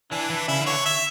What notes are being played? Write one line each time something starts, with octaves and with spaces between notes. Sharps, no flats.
E3 D4
E3
C#3 E4
D3
C#5
E5